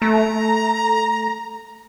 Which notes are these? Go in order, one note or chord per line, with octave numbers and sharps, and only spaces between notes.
A3 A#5